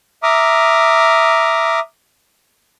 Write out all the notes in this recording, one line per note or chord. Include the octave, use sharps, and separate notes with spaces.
E5 A#5 D6 D#6 F6